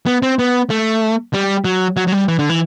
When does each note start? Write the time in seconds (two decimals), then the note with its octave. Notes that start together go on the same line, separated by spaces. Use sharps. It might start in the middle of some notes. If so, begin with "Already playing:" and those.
0.06 B3
0.23 C4
0.39 B3
0.70 A3
1.34 G3
1.65 F#3
1.97 F#3
2.07 F#3
2.12 G3
2.28 E3
2.39 D3
2.50 E3